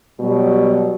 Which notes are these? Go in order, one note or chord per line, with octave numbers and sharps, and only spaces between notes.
B2 F#3 G3